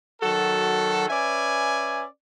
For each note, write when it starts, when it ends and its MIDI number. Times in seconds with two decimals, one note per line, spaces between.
0.22 1.04 51
0.22 1.04 54
0.22 1.04 66
0.22 1.04 69
1.09 2.03 61
1.09 2.03 71
1.09 2.03 74
1.09 2.03 76
1.09 2.03 80